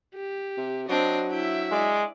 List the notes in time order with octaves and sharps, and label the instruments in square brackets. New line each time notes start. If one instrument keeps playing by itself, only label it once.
[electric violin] G4
[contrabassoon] C3
[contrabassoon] F#3 [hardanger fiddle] C4 D4 [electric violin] D#5
[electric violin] E4 E5 [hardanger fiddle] G5
[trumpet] G#3 [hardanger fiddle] D5